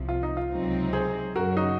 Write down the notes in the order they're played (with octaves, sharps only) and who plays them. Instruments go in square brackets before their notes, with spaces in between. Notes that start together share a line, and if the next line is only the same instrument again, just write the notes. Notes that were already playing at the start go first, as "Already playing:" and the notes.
Already playing: [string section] C2 C3 F3
[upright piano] F4
D#4
F4
[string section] C#2 C3 F#3 C4 D#4
[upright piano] G#4 C5
[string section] F#2 C#3 F#3 [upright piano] F#4 A#4
[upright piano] D#4 F#4